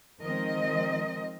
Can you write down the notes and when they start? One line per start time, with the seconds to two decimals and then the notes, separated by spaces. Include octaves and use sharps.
0.21 D#3 F3 G#3 C4 A#4 D#5